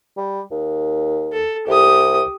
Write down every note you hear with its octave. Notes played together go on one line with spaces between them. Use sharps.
G3
D#2
A4
C2 G4 D#6